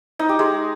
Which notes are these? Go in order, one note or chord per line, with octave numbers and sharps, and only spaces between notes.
D#4
G4
G#3